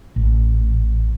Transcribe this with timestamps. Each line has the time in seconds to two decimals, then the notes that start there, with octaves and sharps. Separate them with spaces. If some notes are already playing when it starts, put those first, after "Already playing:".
0.16 A1